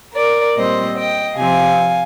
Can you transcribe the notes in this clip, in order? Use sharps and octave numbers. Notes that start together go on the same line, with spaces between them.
A#4 D5
A#2 G3 C4 C5 D#5
D#5 G5
C3 F3 C4 F5 G#5